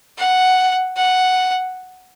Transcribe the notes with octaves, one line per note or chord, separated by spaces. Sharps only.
F#5
F#5